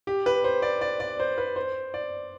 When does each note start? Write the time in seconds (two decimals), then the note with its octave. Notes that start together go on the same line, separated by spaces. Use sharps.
0.07 G4
0.26 B4
0.44 C5
0.62 D5
0.81 D5
1.00 D5
1.20 C5
1.38 B4
1.56 C5
1.94 D5